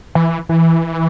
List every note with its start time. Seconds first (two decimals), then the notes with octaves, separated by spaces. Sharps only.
0.15 E3
0.49 E3